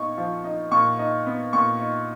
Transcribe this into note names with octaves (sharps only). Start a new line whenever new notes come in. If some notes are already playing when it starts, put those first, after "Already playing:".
Already playing: A#2 B3 D#4 C#6
F3
D#4
A#2 C#6
D#4
B3
A#2 C#6
D#4